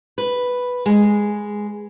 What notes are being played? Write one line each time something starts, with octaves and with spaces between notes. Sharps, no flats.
B4
G#3